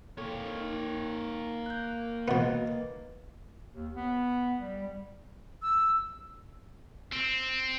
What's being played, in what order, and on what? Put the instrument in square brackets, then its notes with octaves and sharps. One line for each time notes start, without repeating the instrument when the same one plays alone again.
[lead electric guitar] A#3 C#5 [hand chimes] A4
[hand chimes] D#4
F#6 G6
[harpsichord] B2 B3 [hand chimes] B4 D#5 A6
[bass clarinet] D#2
B3
G3
[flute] E6
[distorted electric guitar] C4